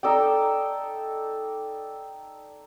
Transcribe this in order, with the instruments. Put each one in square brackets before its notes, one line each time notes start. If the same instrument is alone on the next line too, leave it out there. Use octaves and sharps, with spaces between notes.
[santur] D#4 A4 D5 G5